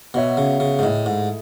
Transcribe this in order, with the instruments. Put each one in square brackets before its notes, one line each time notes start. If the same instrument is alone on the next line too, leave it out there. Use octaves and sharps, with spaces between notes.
[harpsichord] B2 [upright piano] B3 F#4 C#5 E5
[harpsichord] C#3
C#3
G#2
[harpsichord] A2 [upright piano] A3 E4 G#4 D#5
[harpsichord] G#2